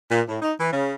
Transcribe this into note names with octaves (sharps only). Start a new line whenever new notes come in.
A#2
A2
D#4
E3
C#3